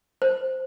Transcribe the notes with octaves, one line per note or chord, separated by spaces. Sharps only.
C5